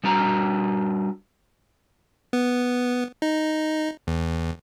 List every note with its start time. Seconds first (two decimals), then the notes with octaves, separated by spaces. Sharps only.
0.04 G3 D4 F#4 A#5
2.33 B3
3.22 D#4
4.07 E2